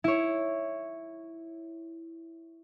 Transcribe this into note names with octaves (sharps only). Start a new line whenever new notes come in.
E4 C#5